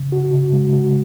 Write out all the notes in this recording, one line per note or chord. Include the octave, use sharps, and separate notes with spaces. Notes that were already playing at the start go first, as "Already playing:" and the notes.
Already playing: C#3
F#4
C#3
G#3
F#4